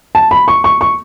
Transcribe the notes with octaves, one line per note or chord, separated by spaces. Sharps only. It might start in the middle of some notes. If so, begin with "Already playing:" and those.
A5
B5
C#6
C#6
C#6